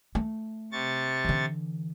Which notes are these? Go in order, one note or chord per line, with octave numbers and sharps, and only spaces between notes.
A3
C3 C#6 A6
D3 E3